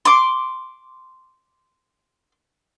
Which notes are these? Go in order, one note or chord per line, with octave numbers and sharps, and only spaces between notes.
C6 D6